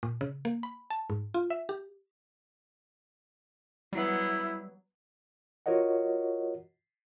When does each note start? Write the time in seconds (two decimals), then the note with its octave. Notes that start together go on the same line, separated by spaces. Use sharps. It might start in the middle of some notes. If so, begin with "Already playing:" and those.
0.03 A#2
0.21 C#3
0.45 A#3
0.63 B5
0.90 A5
1.10 G#2
1.34 F4
1.50 E5
1.69 G4
3.93 F#3 G3 B3 E4
5.66 F4 F#4 A#4 C#5 D#5 F#5